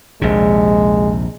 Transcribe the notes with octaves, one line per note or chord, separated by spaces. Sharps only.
A#1 D#2 C3 G#3